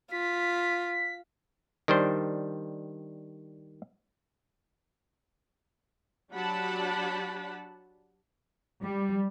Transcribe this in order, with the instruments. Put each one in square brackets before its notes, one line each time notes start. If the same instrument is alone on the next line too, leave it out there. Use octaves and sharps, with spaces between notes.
[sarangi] F4 [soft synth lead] B6
[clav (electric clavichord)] D#3 G3 D4 C5
[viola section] F#3 D4 G4 F#5 A5 B5
[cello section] G3